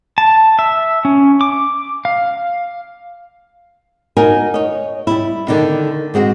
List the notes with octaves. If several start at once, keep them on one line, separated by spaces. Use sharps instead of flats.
A5
E5
C#4
D6
F5
D#4 F#4 A#4 G#5
C#5 D#5
G3 E4
D3 D#3 D4 D#4
G#2 G#3 C4 F#4